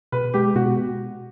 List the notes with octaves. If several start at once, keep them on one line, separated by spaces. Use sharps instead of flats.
B2 B4
G#3 G4
B2 F#4